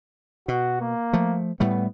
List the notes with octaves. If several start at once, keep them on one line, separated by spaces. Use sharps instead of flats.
B2 F#4
A#3
F3 A3
A2 G3 A3 B3